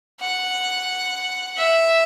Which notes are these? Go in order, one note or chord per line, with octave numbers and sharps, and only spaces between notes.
F#5
E5